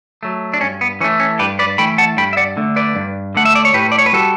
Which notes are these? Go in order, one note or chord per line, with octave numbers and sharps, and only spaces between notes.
F#3 A3
D4
G2 C#4
B3
E3 A3 C#4
C#4
G2 G4 B4
B4 D5
E3 A3 G5 B5
F#5 A5
G2 G5 B5
E5
D5 F#5
D3 A3
B4 D5
G2
D3 A3 F#5
E5
D5
C#5
A2 G4 B4
D5
C#5
B4
G3 F#4 A4